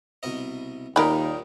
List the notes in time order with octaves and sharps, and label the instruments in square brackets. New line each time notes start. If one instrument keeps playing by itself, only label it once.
[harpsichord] C2 B2 D#5
[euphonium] D#2 [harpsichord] A#2 G3 [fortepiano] D#3 D#4 A#4 [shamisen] D5 B5